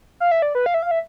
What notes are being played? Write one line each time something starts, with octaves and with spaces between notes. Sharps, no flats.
F5
E5
D5
B4
F5
E5
F5
E5